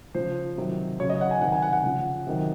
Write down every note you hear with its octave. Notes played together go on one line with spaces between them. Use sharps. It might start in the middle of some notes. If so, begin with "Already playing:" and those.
C#3 F3 C5
C3 D#3 F#3
C#3 F#3 C#5
D#5
F#5
G#5
C3 D#3 F#3 F#5
G#5
F#5
F#5
C#3 F3
C3 D#3 F#3